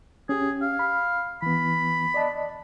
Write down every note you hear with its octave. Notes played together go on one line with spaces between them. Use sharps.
C#4 G4 G#4
F5
B5
E3 B3 B5
D5 D#5 A5